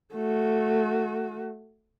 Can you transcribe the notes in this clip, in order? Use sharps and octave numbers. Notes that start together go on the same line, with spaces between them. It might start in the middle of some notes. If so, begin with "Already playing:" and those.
A3 F#4